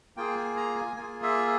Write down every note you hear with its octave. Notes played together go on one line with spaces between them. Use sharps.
A#3 F4 G#4 G5
G#5
A#5
G#5
A#3 F4 G#4 G#5
E5